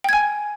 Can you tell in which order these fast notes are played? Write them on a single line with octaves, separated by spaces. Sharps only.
G5 G#6 G#5